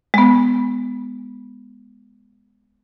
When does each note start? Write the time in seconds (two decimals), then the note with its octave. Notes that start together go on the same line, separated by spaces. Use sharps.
0.14 G#3 B3